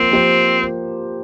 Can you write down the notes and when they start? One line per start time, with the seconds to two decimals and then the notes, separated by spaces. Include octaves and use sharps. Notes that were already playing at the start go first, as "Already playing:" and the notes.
Already playing: F3 A#3 C4 C5
0.11 F3 A#3 G4 C5